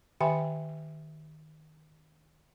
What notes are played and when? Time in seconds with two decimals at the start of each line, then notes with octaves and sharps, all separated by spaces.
0.21 D#3 G4 E5 G5 G#5 C6